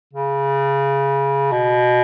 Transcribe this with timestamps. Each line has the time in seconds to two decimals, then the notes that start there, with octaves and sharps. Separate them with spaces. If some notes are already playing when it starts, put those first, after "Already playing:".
0.13 C#3
1.52 B2